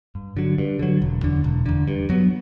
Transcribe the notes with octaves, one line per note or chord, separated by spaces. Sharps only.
G2
D3 F#3
G2
D3 F#3
E1
E2 D3
E1
E2 D3
G2
F#3 B3